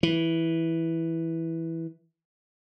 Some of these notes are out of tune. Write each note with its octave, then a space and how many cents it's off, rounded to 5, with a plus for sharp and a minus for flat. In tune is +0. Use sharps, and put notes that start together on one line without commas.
E3 -5